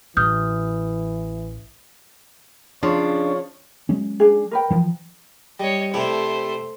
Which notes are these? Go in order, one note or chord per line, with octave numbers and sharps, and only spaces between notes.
A1 E3 D#6 F6 G6
C#3 F3 D4 C#5
F#3 G#3 C#4
D4 G#4
A#4 B4 G5
E3 F3
G3 C#5 D#5
C3 A3 D4 E4 C5